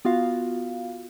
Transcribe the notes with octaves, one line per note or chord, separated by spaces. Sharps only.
B3 F4 F#4 F5